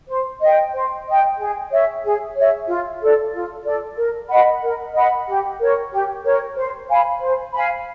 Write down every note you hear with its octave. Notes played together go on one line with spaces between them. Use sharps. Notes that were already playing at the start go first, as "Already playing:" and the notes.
C5
D#5
G5
C5
D#5 G5
G#4
C#5 E5
G#4
C#5 E5
F4
A4 D5
F4
A4 D5
A#4
D#5 F#5 B5
A#4
D#5 F#5 B5
G4
A#4 C#5
G4
A#4 C#5
C5
F5 G#5 B5
C5
F5 G#5 B5